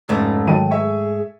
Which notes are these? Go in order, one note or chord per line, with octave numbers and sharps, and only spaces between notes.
F1 G#2 C#3 A3
D#3 F#3 G5 A5 D#7
G#4 E5 G#5 C#6